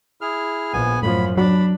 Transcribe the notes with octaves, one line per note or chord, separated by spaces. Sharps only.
E4 G#4 F6
A#1 B3 G#5
F#2 A2 F3 B5
F#3 D4 B5